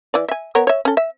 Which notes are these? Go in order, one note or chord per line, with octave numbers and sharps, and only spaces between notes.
E3 D5
E5 G#5
B3 A#4 C#5
C#5 E5
C#4 A4
E5